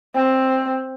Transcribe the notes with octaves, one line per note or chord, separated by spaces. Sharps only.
C4